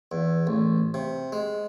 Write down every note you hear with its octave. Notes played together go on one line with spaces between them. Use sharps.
E2
A1
C3
G#3